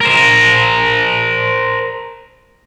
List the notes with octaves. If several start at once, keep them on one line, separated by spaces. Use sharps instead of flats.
A#4 C5